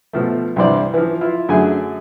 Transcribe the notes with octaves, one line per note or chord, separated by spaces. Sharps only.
B2 F3 A3
C2 G2 E3 G3 C5 D5
E3 F3
E4 F4
F#2 D3 F#3 A3 G#4 G#5